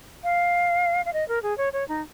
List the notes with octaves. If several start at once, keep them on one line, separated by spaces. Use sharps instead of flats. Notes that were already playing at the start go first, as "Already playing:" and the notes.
F5
F5
D#5
A#4
G#4
C#5
C#5
D#4